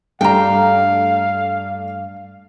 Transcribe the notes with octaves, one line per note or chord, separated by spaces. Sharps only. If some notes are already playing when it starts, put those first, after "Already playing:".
G2 A3 D4 F5 G5 A#5